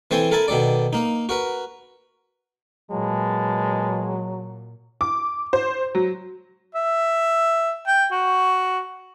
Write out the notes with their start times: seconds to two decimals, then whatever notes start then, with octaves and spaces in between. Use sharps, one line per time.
0.11 E3 C4 A4 C5 G#5 C6
0.31 A4 A#4 E5 G#5 A5 B5
0.48 B2 D#3 A4 D5
0.93 A#3 D#4
1.29 F#4 A#4 B4
2.91 A#2 F#3 G#3 B4 A5
5.01 D6
5.53 C5
5.95 F#3
6.75 E5
7.87 G5
8.12 F#4